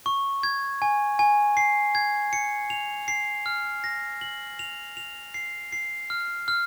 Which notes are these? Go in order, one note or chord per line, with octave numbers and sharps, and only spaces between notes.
C#6
G#6
G#5
G#5
C7
G#6
C#7
F7
C7
F6
A#6
F#7
F7
F7
C7
C7
F6
F6